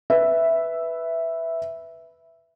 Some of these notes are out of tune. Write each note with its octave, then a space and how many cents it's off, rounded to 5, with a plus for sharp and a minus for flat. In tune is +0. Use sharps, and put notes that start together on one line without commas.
B4 +0 E5 +0